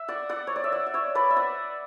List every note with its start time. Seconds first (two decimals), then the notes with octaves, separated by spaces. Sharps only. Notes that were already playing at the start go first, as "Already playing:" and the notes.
Already playing: E5
0.08 D5 F#5
0.29 D5 F#5
0.47 C#5
0.56 D5
0.64 E5
0.72 D5 F#5
0.87 F#5
0.94 C#5 E5
1.15 B4 D5
1.30 E5
1.36 D5 F#5